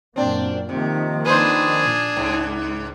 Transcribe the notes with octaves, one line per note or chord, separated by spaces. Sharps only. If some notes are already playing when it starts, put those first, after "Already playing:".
F#2 A#2 A#3 C4 D4
C3 D#3 F3 A#3
D4 G#4 B4 C5
A#2
C#2 G#2